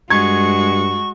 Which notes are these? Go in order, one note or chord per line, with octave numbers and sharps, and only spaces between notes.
G2 G#3 F#4 C#6 G#6